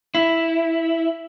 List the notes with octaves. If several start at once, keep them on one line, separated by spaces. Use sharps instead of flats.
E4